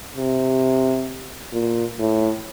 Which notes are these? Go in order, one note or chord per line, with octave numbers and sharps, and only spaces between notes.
C3
A#2
A2